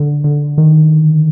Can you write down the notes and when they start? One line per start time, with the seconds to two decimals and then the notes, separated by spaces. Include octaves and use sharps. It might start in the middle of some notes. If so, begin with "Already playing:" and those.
Already playing: D3
0.24 D3
0.58 D#3